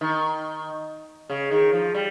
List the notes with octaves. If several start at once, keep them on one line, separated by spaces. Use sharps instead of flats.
D#3
C#3
D#3
F3
G3